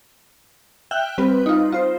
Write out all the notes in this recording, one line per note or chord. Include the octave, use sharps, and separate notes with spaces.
E5 G5 F6 F#6
G3 C4 B4
D#4 F4
F4 C5